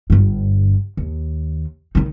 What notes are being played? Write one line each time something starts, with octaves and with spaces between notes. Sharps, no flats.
G1 G2
D#2
D#3 D#4